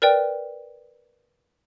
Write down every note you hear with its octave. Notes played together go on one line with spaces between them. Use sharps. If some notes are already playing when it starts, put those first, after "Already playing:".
A#4 B4 D5 G5